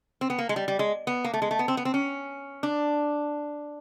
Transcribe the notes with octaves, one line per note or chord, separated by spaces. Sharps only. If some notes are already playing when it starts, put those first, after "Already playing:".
C4
B3
A#3
G#3
G3
G3
G#3
B3
A#3
A3
G#3
A3
B3
C4
B3
C4
C#4
D4